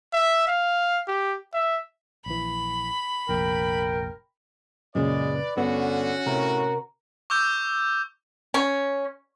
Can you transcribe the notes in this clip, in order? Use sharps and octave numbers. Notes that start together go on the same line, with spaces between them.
E5
F5
G4
E5
A#1 E3 B5
F1 A#1 A#4 G5
F#2 A#2 C#3 G#3 B4 D5
G2 D3 B3 C#4 F#4
A2 C3 A#4
C#6 D6 E6 G6
C#4